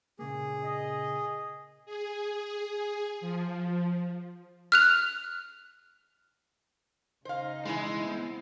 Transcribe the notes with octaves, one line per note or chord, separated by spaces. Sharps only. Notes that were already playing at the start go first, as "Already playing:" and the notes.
A#2 C#3 A#3 G#4
D#5
G#4
F3
F6 F#6 F7
C#3 D#4 C5 F5
B2 E3 G#3 E4
B3 C4